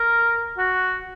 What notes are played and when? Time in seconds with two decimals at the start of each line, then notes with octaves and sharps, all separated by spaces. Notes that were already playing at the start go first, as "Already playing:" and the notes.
Already playing: A#4
0.58 F#4